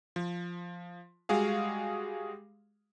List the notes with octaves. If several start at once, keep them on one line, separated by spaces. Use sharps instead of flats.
F3
G3 G#3 F#4 G#4 F5